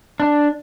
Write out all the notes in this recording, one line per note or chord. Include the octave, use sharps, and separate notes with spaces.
D4